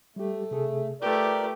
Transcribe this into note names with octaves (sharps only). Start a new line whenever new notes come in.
G3 A3 G4
C3 G#4 A4
A3 F4 G4 A#4 B4 D5